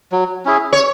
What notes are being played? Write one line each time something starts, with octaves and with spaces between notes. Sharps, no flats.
F#3
C#4 E4 G#4
C#5